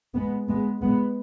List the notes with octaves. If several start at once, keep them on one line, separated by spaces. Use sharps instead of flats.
G#3 B3
G#3 B3
G#3 B3